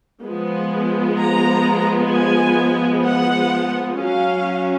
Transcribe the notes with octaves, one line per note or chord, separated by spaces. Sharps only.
F3 G#3 B3
A#5
G#5
F#5
F#3 C#4 F5